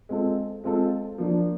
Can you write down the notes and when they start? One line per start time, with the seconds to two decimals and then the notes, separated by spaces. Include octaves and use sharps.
0.09 G#3 C4 F4 A4
0.64 G#3 C4 F4 A4
1.18 F3 A#3 D4